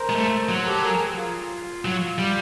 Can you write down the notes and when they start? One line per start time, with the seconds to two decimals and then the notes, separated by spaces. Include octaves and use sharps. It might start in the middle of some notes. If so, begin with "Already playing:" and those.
Already playing: A#4 C5
0.09 G#3
0.16 A3
0.49 F#3
0.66 G4 A4
0.83 G#4 A#4
1.17 F4
1.85 F#3
2.18 G3